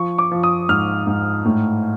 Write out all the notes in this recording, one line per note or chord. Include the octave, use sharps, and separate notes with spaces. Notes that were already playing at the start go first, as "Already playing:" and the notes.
Already playing: F3 C#6
D6
F3
D#6
G#2 F6
G#2
A2